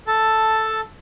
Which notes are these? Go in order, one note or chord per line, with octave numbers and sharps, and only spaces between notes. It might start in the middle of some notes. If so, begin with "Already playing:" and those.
A4 A5